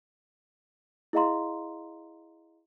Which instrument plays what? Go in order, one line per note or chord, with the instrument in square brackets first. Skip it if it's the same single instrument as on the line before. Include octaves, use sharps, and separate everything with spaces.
[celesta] E4 G#4 D#5 F5 A#5 C6